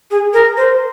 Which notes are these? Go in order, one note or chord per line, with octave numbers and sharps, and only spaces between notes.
G#4
A#4
C5